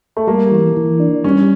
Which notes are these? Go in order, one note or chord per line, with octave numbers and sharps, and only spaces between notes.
A3
G3 A#3
E3
E3
D4
G3 C#4